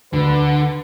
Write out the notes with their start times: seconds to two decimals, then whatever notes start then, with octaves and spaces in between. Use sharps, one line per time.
0.13 D2 D3 B4